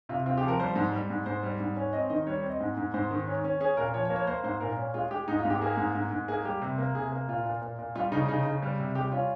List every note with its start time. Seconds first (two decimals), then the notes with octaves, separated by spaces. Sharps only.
0.09 C3 F4
0.26 C4 F4
0.38 G4
0.43 F3 A#4
0.60 G3 C5
0.76 G#2
0.92 G3
1.10 G#2
1.26 G#2 C5
1.43 G3
1.60 G#2
1.76 C#4
1.93 C4 D#5
2.10 D#3 D#5
2.27 G3 C#5
2.38 C#5
2.43 C4
2.49 D#5
2.60 G#2
2.77 G#2
2.94 G#2 C5
3.11 D#3
3.27 C#4
3.44 C#4
3.60 C#4 G#4
3.77 A#2 A#4
3.94 F3 C#5
4.05 C#5
4.10 A#3
4.16 C#5
4.27 A#3 C5
4.44 G#2 C5
4.60 A#2 A#4
4.77 C#4
4.94 G#3 F4
5.11 G#3 G4
5.28 G#2 D#4
5.39 F4
5.45 G#2
5.50 G4
5.61 A#3 G#4
5.77 G#2
5.95 G#2
6.11 G#2
6.28 A#3 G#4
6.45 G3 G4
6.62 C3
6.78 A#3
6.95 C3 G#4
7.12 A#3
7.28 A#2 F4
7.46 A#2
7.62 A#2
7.79 A#2
7.96 G3 F4
8.12 C#3 D#4
8.28 C#3 D#4
8.46 C#3
8.62 G3
8.79 C3
8.95 G3 G4
9.12 C#4 F4